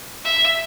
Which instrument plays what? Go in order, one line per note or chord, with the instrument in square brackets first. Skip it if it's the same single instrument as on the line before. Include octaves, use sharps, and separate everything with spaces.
[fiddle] E5